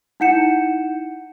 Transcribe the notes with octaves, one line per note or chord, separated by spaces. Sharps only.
D#4 E4 F#5 G6 C#7 E7